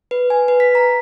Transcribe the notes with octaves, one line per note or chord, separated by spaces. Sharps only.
B4
G#5
B4
B6
A#5